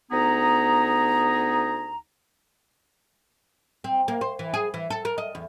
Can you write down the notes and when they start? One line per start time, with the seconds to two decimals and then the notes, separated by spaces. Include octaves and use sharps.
0.11 D2 B3 D#4 G#4 A#5
3.84 C4
4.08 A#3
4.21 C5
4.39 E3
4.54 G#4
4.74 E3
4.90 A4
5.05 A#4
5.18 D#5
5.35 E2